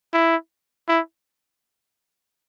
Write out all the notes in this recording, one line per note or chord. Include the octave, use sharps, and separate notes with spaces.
E4
E4